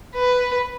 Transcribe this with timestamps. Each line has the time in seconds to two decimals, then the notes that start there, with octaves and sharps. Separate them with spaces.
0.16 B4